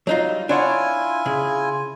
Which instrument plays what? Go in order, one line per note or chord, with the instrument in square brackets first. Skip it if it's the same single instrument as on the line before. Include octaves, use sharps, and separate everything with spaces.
[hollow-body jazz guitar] F#3 D#4 F4
[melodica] G3
[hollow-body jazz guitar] D4 C#5 F#5 [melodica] E4 F4 G#5
[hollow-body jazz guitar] C#3